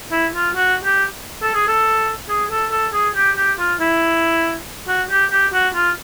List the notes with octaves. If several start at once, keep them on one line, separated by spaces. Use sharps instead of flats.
E4
F4
F#4
G4
A4
G#4
A4
G#4
A4
A4
G#4
G4
G4
F4
E4
F#4
G4
G4
F#4
F4